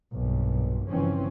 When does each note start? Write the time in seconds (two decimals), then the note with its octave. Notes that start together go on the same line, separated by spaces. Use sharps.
0.13 B1 G2 A#2
0.87 G1 C#3 E3 F3 C4 C#4